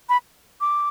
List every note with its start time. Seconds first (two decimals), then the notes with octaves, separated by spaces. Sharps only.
0.09 B5
0.61 D6